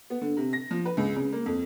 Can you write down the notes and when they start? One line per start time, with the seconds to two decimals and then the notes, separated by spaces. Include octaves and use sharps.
0.10 B3
0.21 D3
0.37 C3
0.53 A#6
0.71 F3
0.85 B4
0.97 C#2
1.16 C#3
1.32 A#3
1.46 F2